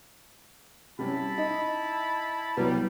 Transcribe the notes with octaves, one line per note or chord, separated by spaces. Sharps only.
C3 G3 C#4 E4 A5 B5
D#4 D#5
C2 F#3 G3 B3